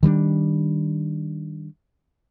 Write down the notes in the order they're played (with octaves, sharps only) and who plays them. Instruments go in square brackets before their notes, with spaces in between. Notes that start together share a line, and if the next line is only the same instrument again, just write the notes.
[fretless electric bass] D#3 G3 C4 D4